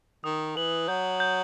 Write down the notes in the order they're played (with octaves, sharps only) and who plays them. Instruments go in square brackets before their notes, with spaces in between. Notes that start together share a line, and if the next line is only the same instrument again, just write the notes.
[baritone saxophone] D#3 [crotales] D#6
[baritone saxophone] E3 [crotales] F#7
[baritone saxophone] F#3 [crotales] G6
[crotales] G6